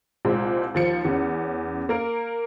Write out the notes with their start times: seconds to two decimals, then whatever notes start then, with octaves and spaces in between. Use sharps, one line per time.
0.25 C2 A#2 G#3 C4
0.74 D#2 F3 C#7
1.05 E2 C#4
1.89 A#3 A#4